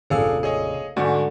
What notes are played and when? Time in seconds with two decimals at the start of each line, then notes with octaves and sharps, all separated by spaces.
0.10 F1 A#1 C#3 D4 G#4 A4 F5 E6
0.43 G#4 C#5 D#5
0.97 D2 G#2 D3 F#4 G#5